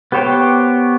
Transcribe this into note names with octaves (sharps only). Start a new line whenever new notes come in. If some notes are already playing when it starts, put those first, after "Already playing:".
B3 G4 C5 C#5 G5